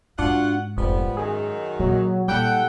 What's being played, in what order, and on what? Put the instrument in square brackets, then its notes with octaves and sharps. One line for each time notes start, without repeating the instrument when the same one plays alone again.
[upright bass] G#2 [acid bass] D4 [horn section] F4 F#4 F#5
[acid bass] F1 [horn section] F3 G3 B3
[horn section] F#2 D#3 [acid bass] G#4
[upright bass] A#2 [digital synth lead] F#3
[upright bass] A#2 [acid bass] G3 [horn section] E4 A4 G5 [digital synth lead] F#5